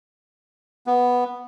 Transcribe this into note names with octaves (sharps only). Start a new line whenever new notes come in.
B3